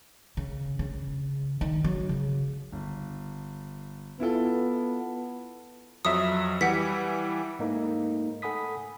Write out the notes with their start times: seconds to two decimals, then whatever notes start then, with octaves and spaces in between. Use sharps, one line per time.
0.37 C#3
0.79 C#3
1.61 D#3
1.84 F#3
2.09 C#3
2.72 G1
4.20 B3 E4 F4 A4
6.05 F2 F#3 E5 D#6
6.61 E3 G3 B4 F#5 B6
7.59 G#2 A3 A#3 D#4
8.42 A4 F#5 G#5 B5 D#6 B6